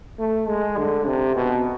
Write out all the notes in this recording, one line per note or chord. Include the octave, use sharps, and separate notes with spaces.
A3
G#3
D3
C3
B2